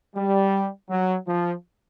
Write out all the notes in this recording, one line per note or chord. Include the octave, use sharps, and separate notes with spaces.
G3
F#3
F3